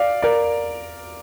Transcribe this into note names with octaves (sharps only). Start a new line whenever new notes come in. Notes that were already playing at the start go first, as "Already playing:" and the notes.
Already playing: D5 F5
A#4 D5